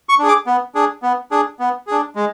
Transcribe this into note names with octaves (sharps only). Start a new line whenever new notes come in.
C#6
D4 G#4
D6
B3
D4 G#4
B3
D4 G#4
B3
D4 G#4
G#3